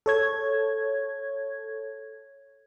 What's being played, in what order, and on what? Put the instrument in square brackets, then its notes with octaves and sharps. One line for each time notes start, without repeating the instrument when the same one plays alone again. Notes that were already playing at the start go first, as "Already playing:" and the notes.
[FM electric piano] A4 C#5 G#6